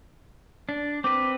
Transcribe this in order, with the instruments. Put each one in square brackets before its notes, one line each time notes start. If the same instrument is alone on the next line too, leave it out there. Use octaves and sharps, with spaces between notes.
[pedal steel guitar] D4
[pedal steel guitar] C4 B4 [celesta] D6